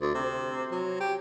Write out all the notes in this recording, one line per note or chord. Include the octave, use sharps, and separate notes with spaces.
D2
C3
F#3
G4